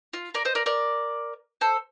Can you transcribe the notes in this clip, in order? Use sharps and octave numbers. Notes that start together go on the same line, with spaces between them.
F4
A#4 D5
C5 D#5
A#4 D5
A#4 D5
A4 C5